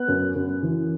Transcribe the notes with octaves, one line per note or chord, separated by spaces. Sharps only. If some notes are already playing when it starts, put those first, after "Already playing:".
Already playing: B3 F#6
F#2
F#2
E3